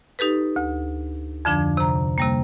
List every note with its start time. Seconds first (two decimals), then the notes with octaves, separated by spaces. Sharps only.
0.19 D#4 G4 A4 B4
0.56 D2
1.45 F2 D3 F3 D4
1.77 C3 A#5
2.18 C3 G3 A#3